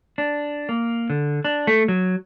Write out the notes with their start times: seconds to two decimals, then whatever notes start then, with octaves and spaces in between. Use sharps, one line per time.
0.18 D4
0.69 A#3
1.10 D3
1.45 D4
1.67 A3
1.88 F#3